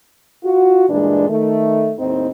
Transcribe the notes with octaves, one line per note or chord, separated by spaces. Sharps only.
F4 F#4
G2 A#2 E3 G#3 D4
D#3 A3
D#2 A2 C4 D#4